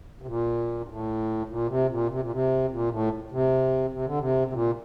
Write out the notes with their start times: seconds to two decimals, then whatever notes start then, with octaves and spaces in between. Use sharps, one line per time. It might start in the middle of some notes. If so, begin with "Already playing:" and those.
0.22 C3
0.27 A#2
0.81 G2
0.88 A2
1.49 A#2
1.68 C3
1.89 A#2
2.10 C3
2.21 A#2
2.31 C3
2.71 A#2
2.91 A2
3.31 C3
3.92 C3
4.06 D3
4.18 C3
4.48 C3
4.53 A#2